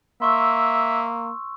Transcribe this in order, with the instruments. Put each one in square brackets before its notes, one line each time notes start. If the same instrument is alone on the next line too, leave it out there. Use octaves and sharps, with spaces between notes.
[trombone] A#3 [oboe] E5 [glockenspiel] C6 C#6 E6